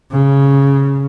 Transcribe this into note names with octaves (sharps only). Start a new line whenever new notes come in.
C#3